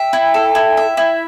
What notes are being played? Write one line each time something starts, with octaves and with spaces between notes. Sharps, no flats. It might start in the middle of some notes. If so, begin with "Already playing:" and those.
Already playing: E5 G5
E4
A4
E4
E5
E4